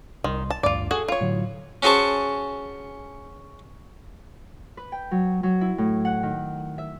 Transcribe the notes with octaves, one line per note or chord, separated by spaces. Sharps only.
C2 D#3 C6
A5
A1 D2 G2 F4 D5
F#4 G#4 A4
F4 C#5
A2 D3 F#3
C#4 F#4 G#4 C5 A5 C#6
B4
G5
F#3
F#3
E4
A2
F#5
D#3
E5